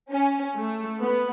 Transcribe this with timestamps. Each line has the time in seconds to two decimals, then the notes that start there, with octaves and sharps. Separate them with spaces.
0.11 C#4
0.57 A3
1.01 B3